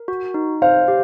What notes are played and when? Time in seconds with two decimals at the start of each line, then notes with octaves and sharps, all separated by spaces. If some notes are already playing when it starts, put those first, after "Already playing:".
Already playing: A#4
0.08 F#4
0.34 D#4
0.62 C5 F5
0.88 G4